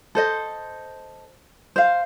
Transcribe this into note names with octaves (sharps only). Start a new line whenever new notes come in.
A4 C5 D#5
C5 F5